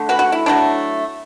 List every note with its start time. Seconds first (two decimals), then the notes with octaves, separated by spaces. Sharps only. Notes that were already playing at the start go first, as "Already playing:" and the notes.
Already playing: D3 A3
0.09 F#4 B4
0.19 F#4
0.32 E4
0.46 F#3 A3 D4